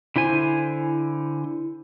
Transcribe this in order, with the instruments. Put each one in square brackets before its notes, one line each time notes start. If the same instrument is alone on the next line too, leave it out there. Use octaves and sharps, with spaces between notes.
[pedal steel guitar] D3 E4 C5 G#5